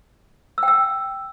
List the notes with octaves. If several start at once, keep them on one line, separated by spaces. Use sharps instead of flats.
E6
G5
E6